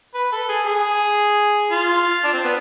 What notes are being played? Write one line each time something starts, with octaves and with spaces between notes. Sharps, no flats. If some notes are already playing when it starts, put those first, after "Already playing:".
B4
A4
G#4
G#4
F4
D4
C4
B3